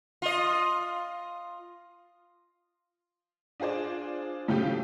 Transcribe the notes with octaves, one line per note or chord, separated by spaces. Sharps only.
F4 D#5
D4 F4 G#4 C5 D5
A2 C#3 F#3 A3 F4 G4